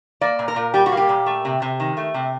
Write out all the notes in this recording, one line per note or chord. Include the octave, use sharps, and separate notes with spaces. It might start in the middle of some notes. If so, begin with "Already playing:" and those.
A#3 D5
A#2
A#4
A#2
G3 G4
F#4
A#3
G4
A#2
A3
C3
C3
D#3
A3
C3